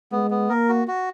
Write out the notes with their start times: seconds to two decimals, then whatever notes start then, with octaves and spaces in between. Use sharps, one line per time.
0.12 G#3 B3
0.31 B3
0.50 A#3 A#4
0.69 F#4
0.88 F#4